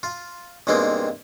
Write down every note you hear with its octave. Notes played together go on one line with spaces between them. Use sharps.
F4
B1 G2 G#3 A#3 C4